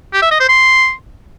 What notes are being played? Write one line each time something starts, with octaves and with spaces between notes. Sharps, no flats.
G4
E5
D#5
C5
C6